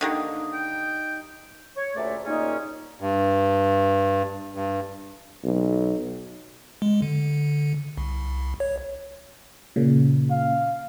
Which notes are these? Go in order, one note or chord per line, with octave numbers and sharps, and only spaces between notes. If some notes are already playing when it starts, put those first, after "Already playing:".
D3 D#3 A#3 D#4 G4 D#5
G5
C#5
D2 A#2 C#3 A3 D5 E5
D#2 A#2 C#3 A#3 C#4 D#4
G2
G2
B1
G#3
D3
C2
C#5
A#2 C#3
F5